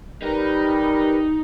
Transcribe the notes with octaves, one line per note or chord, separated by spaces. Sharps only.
G3 D#4 G4 A#4 B4